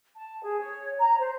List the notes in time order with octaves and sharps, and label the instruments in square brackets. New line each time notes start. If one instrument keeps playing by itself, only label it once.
[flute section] A5
G#4
C#5
A#5
C5